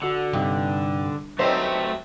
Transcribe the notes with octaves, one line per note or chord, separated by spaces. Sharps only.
D3 F#4 E6 C#7
G2 C3 G3 D#4
F#3 A3 C4 D#4 G4 B4 C5 B6